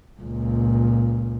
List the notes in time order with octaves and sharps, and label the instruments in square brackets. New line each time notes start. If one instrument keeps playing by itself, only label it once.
[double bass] C#2 A#2